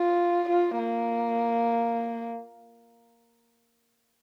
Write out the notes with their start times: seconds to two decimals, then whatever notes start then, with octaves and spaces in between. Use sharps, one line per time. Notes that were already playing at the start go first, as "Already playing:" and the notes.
Already playing: F4
0.49 F4
0.79 A#3